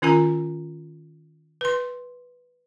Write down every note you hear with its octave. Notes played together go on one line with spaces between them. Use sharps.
D#3 C#4 F4 A#4 G#5 A#5
B4 C6